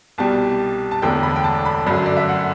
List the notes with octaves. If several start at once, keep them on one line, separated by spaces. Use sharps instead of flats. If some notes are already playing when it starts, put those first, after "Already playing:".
C2 B2 G3 A5
A5
E1 E2 D3 A3 G5
B5
G5
A5
B5
G1 F#2 D3 F#3 A3 B5
D5
E5
F#5